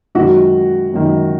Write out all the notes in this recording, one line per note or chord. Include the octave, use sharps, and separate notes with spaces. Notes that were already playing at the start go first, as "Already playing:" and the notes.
F#2 D#3 G#3 F#4
F#2 D#3 G#3